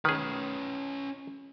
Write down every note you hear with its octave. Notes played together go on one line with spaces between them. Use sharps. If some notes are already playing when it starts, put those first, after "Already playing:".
D#3 C#4 G#4 B4